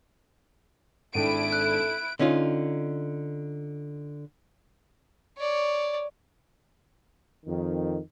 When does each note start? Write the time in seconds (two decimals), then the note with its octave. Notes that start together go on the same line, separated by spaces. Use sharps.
1.14 G#1 D4 E4 A4 G5 D7 D#7
1.53 F#6
2.19 D3 C#4 D#4 F4
5.37 C#5 D5
7.46 F2 D#3